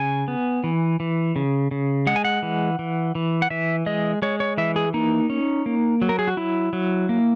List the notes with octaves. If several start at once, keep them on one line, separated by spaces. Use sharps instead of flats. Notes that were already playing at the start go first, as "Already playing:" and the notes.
Already playing: C#3 G#5
B3
E3
E3
C#3
C#3
G#3 F#5
G#5
F#5
E3
E3
E3
F#5
E3 E5
G#3 D#5
G#3 C#5
C#5
E3 E5
G#4
A#3 D#4
C#4
A#3
F#3
A#4
G#4
F#4
F#3 E4
F#3
A#3